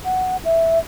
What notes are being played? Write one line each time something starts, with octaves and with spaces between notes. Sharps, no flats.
F#5
E5